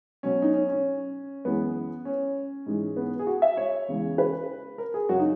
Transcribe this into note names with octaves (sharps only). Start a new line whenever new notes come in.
B2 F#3 C#4
D#4
C#4
C#4
F#2 E3 G#3 B3
C#4
G#2 E3 G#3
B3
G#4
F#4
E5
C#5
E2 C#3 E3 G#3
B4
A#4
G#4
F#2 C#3 F#3 F#4
D#4